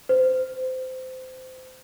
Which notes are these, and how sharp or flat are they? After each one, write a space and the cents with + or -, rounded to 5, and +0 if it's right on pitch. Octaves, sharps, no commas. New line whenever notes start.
C5 -20